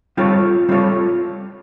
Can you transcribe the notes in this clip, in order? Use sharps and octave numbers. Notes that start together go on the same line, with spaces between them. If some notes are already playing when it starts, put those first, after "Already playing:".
G3 C4 F4 A4 C#5
G3 C4 F4 A4 C#5